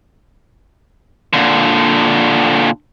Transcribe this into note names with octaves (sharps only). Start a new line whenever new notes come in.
A#2 D3